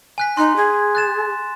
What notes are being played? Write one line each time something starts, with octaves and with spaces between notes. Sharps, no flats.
G#5 F#6 B6
D#4 C6 F#6
G#4
F#6 A6 E7